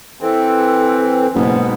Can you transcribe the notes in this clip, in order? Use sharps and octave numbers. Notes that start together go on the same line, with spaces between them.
E3 C4 A4
F#1 G#2 B2 B3